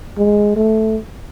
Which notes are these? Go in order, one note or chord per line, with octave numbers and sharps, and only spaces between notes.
G#3
A3